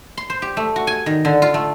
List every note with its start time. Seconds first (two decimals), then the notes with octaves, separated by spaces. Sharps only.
0.17 C6
0.30 C5
0.42 G4
0.57 A3
0.76 F#4
0.87 G#5
1.06 D#3
1.25 D3
1.42 F4
1.54 A3